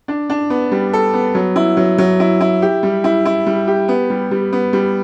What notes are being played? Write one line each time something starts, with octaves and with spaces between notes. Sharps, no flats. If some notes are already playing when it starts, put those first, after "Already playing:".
D4
D4
B3
G3
A4
B3
F#3
E4
F#3
F#3
E4
E4
G4
G3
E4
E4
G3
G4
B3
G3
G3
B3
G3